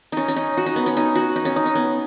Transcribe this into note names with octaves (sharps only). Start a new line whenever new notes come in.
C#4 D#4
C#4
D#4
F#4
D#4
B3
C#4
D#4
F#4
D#4
C#4
D#4
C#4
B3